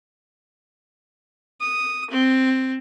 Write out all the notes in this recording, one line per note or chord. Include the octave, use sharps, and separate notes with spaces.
D#6
C4